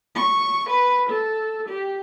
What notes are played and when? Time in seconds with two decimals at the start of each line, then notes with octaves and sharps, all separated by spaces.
0.15 C#6
0.69 B4
1.09 A4
1.69 G4